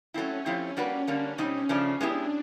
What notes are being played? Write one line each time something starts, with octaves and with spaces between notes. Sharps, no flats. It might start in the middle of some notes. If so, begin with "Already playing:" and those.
F#3 A3 C4 C#4 E4
F3 A3 C4 E4 G4
G3 A#3 D4 F#4 B4
D3 G3 A#3 C#4 D4
B2 G3 C4 D#4
C#3 F3 A3 D4
G#3 B3 D4 E4 G4